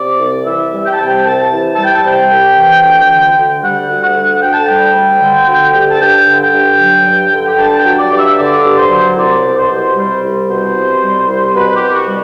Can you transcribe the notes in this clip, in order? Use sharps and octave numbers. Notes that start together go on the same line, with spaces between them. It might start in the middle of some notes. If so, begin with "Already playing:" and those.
Already playing: C3 D5
C2
E3 E5
G3
G5
A5
C3 G5
C2 A5
E3
G3 A5
G5
A5
C3 G5
C2
E3
D2
D3
D2
G3 F#5
D2
F#5
D3
D2 G5
A5
G3 G5
D2
D3
D2
G3
A5
G2 G5
D3
G5
G2
F#3
G2
D3
G5
G2 A5
G5
F#3
D5
G2 D5
E5
D3 D5
G2
C5
F#3
C2 D5
B2
C5
C2
G3 C5
C2
B2 C5
C2
G3
C2
C5
B2 B4
G4
C2
F#4
G3